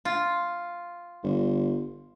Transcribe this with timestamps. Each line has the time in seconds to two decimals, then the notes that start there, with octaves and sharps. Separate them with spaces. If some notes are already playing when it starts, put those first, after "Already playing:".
0.05 F4
1.23 G1